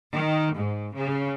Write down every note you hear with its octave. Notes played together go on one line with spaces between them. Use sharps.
D#3
G#2
C#3